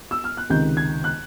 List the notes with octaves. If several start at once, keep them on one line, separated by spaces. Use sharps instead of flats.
E6
F6
F#6
C#2 C3 D#3 G6
G#6
F#6